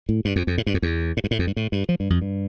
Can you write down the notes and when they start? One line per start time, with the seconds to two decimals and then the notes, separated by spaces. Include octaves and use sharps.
0.09 A2
0.25 G2
0.36 F2
0.47 F2
0.58 A2
0.67 G2
0.74 F2
0.82 E2
1.17 A2
1.24 G2
1.31 A2
1.39 F2
1.47 G2
1.57 A2
1.72 G2
1.89 F3
2.00 G2
2.10 F2
2.22 G2